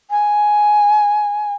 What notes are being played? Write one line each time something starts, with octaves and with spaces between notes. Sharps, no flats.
G#5